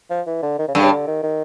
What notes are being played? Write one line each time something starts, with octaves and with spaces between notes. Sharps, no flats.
F3
E3
D3
D#3
C#3
G2 D3
C#3
D3
D#3
D#3